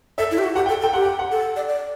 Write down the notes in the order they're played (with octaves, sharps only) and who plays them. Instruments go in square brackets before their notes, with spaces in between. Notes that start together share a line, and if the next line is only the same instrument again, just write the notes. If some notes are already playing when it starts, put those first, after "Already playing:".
[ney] A4 [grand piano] E5
[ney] E4
G4
F#4
[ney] G4 [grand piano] F#5
[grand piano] G5
[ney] A4
[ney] A4 [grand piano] G5
[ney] G4 [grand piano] F#5
[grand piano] G5
F#5
[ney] A4
D5
D5